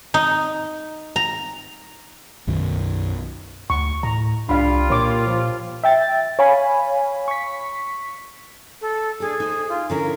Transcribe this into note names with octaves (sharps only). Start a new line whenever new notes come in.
D#4
A#5
B1 F#2 D#3
D2 C#6
A2 A#5
C2 G3 D4 F4 F5 B5
A#2 A#3 C#5 D6
F3
E5 G5 A6
C#5 F5 G#5 B5
C#6 B6
A4
D4 G#4 A4
D#4 C5
F4
D3 C#4 E4 A#4